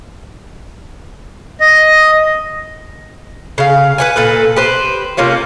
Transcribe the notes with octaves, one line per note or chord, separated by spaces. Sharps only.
D#5
C#3 F5
B4 F#5 G#5
A#2 A4 B4
G4 B4 C5
C3 A#3 C#4 F4